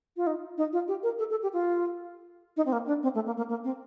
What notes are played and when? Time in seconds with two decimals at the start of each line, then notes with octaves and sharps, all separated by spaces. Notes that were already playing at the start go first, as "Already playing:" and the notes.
0.17 F4
0.27 D#4
0.58 D#4
0.73 F4
0.88 G4
1.03 A#4
1.19 A4
1.31 A4
1.43 G4
1.53 F4
2.57 D#4
2.66 C4
2.72 A#3
2.87 D4
3.03 C4
3.15 A3
3.26 A#3
3.37 A#3
3.49 A#3
3.64 C4